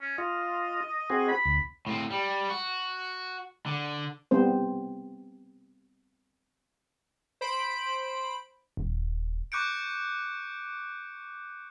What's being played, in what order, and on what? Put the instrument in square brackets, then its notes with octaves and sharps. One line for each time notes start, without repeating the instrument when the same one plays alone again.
[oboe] C#4
[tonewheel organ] F4 [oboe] D#5
[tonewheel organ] C4 F#4 G#4
[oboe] B5
[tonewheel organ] D2
[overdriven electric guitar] A2 C4
G3
F#4
D3
[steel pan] G3 B3 C4 C5
[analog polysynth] C5 B5 D7
[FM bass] D#1
[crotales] C#6 D6 F#6 G6 C#7 D7